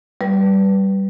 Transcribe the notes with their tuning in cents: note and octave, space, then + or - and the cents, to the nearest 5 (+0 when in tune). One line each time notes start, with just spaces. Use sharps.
G3 -15 B4 -5